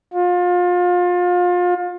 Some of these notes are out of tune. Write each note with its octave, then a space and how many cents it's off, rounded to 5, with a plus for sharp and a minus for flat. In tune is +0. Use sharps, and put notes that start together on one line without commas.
F4 +30